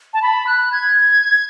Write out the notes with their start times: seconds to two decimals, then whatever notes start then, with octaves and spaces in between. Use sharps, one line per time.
0.14 A5
0.22 B5
0.47 F#6
0.72 G#6